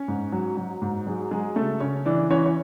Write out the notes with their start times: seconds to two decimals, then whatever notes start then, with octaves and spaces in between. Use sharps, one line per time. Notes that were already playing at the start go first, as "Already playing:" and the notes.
Already playing: C#4 C#5
0.08 G#2
0.32 F#3
0.57 F#3
0.82 G#2
1.07 F#3 G#3 G#4
1.31 F#3 G#3 G#4
1.56 C#3 A3 A4
1.80 C#3 C#4 C#5
2.06 E3 D4 D5
2.30 E3 C#4 C#5
2.46 C#5